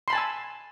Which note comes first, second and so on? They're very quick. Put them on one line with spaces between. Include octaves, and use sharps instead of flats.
C6 B5 A5 G#5 E6